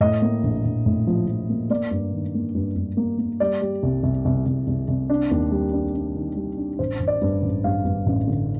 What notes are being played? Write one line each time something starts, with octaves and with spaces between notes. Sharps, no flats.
A2 D#5
A#3
A#1
A#1
A2
F3
F3
A#3
A#3 D5
G2
D#3
A#3
G2
G2
A#3
A#3
G3 D5
G3
C2
C2
C2
C2
C2
C2
D4
D#2
G3
D4
D4
D#3
G3
D4
A1 C5
A1
D5
G2
A1
G2 F5
G2
A1
D3